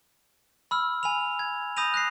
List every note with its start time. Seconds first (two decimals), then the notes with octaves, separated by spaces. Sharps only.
0.71 B5 E6 F6
1.03 G#5 B5 F7
1.39 G#6
1.77 B5 D#6 G6 A#6 D#7 F7
1.94 F#6 A#6 C7